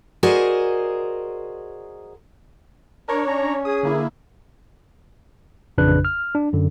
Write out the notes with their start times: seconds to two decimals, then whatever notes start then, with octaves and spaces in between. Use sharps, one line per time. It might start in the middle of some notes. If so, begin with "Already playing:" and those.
0.23 F#4 G#4 A#4 C5 D5 D#5
3.08 D4 A#4 C#5
3.26 C#4 A#5
3.65 G#4 D#6
3.83 D3 A#3 E4
5.78 A1 F2 C#3 D4 B4 F#6
6.05 F6
6.35 D4
6.53 F#2 D3